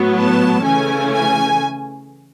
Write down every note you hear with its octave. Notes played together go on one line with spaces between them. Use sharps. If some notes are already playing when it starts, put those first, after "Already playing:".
Already playing: A2 F#3 B3
A5
C#3 E3 A3 C#4 G#5
G#5